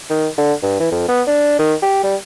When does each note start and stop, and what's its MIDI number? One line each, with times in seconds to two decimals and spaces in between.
0.10 0.27 51
0.38 0.53 50
0.63 0.77 43
0.79 0.87 52
0.92 1.05 41
1.08 1.22 59
1.27 1.58 62
1.59 1.74 51
1.83 2.00 67
2.03 2.15 55